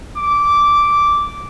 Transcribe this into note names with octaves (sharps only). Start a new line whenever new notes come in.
D6